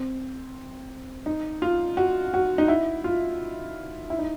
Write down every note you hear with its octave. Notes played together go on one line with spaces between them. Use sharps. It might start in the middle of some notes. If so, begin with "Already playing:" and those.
Already playing: C4
D#4
F4
F#4
F#4
D#4
E4
F4
E4
D#4